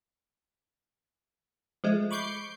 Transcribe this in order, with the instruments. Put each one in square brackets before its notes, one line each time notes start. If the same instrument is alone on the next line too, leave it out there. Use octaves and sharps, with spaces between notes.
[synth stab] F3 G#3 A3
B5 C#6 D6 G6 C7